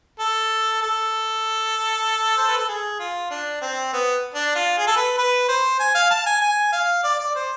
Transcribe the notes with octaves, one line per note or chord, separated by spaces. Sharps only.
A4
A4
C5
B4
A4
G#4
F4
D4
C4
B3
D4
F4
G#4
A4
B4
B4
C5
G#5
F5
A5
G#5
G#5
F5
D5
D5
C5